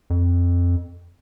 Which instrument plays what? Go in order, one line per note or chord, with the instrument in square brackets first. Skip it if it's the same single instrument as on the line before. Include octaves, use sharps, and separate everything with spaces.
[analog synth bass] F2